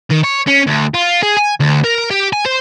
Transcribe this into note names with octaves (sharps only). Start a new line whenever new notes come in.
D#3
C#5
C#4
D2
F4
G#4
G#5
D2
A#4
G4
G#5
C5